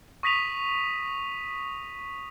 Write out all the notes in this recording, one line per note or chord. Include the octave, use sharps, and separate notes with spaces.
C#6 D#6 A#6 B6 D#7 F7